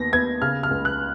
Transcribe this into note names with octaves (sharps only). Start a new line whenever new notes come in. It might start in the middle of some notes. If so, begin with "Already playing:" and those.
Already playing: D#2 B3 A#6
B3 G#6
C#3 F6
F6
C#2
F#6